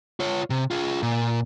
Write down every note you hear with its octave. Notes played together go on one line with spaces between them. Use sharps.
F4 C#5
C3
F4 G#4
A#2